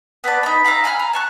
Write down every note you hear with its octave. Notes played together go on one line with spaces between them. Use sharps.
B3 B4 D5 A5
D#4 B5
E5 F5 A#5 B5
G#5 B5 D#6 F6
A#5
A5 C#6 F#6